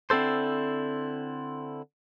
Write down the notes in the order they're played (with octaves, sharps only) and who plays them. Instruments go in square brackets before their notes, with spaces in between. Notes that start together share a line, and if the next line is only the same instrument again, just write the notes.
[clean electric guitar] D3 C4 E4 A4 C5